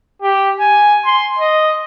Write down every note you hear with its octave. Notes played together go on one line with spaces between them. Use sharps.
G4
G#5
C6
D#5